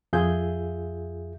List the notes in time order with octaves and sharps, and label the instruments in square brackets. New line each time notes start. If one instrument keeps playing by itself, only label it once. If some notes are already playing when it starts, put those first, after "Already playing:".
[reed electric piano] F2 F4 G#4 E5 G6